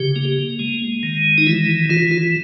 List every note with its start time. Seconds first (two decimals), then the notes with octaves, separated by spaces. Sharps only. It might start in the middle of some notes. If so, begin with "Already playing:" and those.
Already playing: C#3 G4
0.16 A#3
0.59 G#3
1.03 D#3
1.38 D#4
1.47 E3 E4
1.90 E3 F4
2.11 F4